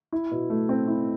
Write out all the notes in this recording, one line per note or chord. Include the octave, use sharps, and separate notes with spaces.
E4
B2
A3
C4
E4